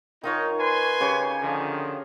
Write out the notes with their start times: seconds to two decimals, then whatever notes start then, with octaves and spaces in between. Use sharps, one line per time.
0.23 D#3 D#4 F4 C#5
0.60 B4 G#5 C6
1.00 C#3 G4 C#5
1.43 D3 D#3 F3